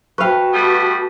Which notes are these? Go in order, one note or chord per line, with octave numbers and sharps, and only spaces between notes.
F#4 B4 F5 G5 A5 C#6
G3 A3 B3